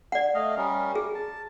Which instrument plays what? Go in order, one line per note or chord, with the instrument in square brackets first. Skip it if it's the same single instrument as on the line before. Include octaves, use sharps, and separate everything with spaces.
[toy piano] D5 F#5
[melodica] A3 D#5 F5
G3 C#4 A#4
[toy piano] G#4
[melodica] A5